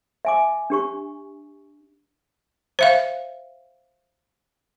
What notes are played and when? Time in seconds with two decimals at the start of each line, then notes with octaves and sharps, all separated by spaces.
0.25 E5 G#5 D6
0.70 D4 G4 C#6
2.79 C5 E5 F5